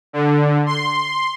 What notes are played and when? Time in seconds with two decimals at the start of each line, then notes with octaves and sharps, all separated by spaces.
0.13 D3
0.66 C6